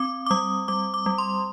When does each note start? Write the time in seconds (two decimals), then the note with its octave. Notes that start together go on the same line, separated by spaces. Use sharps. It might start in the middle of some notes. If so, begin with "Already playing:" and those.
Already playing: C4 D6
0.26 D6
0.31 G3 D#6
0.68 G3 D6
0.94 D6
1.06 G3
1.18 C6